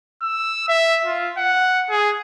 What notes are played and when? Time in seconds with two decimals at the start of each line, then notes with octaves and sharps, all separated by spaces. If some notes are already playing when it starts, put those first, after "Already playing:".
0.22 E6
0.68 E5
1.05 F4
1.37 F#5
1.90 G#4